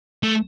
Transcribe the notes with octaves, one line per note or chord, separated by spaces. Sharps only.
A3